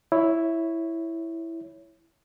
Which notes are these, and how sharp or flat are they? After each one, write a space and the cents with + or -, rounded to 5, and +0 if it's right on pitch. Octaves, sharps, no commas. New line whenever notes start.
E4 +0 C#5 +0